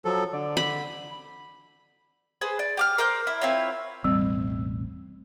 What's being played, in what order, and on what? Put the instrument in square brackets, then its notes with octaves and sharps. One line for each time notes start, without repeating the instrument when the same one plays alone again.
[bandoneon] F3 F#3 A4
[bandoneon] D3 [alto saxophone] D5
[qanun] B5
[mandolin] G#4 B4 C5
D5
G4 D6 F6
A#4 C5 D6 G6
E4
C4 E4 F4 C#5
[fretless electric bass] E1 A1 C4 [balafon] G3